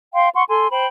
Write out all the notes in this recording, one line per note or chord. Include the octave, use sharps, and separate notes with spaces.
F5 G5 C6
F#5 C6 C#6
A4 G#5 C6
C5 G5 B5